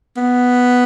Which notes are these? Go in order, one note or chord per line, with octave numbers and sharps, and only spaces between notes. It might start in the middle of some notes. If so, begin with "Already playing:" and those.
B3